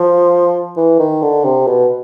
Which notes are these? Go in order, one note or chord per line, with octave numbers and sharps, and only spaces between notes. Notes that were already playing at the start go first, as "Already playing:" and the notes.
Already playing: F3
E3
D#3
D3
C3
B2